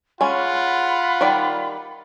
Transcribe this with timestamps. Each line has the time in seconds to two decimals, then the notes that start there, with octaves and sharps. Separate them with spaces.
0.21 G#3 C#4 F4 F#5 B5
1.21 D#3 G3 D5